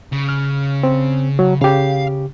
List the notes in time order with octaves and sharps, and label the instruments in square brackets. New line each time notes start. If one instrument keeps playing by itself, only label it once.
[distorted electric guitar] C#3
[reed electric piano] F6
C4
F#3
[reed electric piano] C#3 G4 [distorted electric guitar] F5